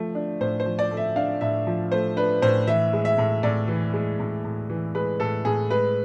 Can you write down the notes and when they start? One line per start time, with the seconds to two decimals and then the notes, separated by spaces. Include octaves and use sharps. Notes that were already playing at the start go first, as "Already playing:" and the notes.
Already playing: F3 A3
0.15 D4
0.41 A2 C5
0.60 C5
0.66 F3
0.79 D5
0.91 A3
0.97 E5
1.16 D4 F5
1.41 A2 E5
1.67 F3
1.92 A3 C5
2.17 D4 B4
2.42 A2 C5
2.67 E3 E5
2.93 G#3
3.05 E5
3.18 A2
3.43 A2 D5
3.68 E3
3.93 G#3
4.19 A2
4.44 A2
4.70 E3
4.95 G#3 B4
5.20 A2 A4
5.45 A2 G#4
5.70 G#3 B4